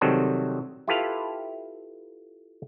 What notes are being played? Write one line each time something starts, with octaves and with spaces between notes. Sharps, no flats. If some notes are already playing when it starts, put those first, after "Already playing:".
C3 D#3 F#3 G3 C4 A4
E4 F4 G4 A4 B4 F5